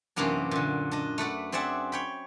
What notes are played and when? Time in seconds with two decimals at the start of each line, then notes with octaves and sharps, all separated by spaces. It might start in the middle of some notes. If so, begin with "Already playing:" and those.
0.16 F#2 C3 E3 A#3 B3 D4
0.51 A#2 D3
0.91 D4 D#5
1.18 A3 B4 D5 F#5
1.52 C4 G#4 D5 E5 F#5
1.92 C#5 G5 B5